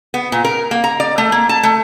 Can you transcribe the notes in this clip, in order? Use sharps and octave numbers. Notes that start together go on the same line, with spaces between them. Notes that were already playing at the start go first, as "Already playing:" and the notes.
B3
A#2
A#4
A#3
A#5
D5
A3
A#3
A5
A3